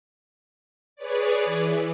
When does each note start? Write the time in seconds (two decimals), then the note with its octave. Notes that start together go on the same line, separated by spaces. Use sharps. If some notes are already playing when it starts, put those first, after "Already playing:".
0.96 G#4 B4 C#5 D5
1.45 E3